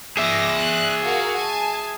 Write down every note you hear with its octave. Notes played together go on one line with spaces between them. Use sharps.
G#4 E5 D6 A#6
F#6
F#4 A#4 F5
G#5 A5